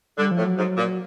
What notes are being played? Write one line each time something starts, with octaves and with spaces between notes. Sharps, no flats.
D3 G3
F3
A2
F#3
G#2
A#2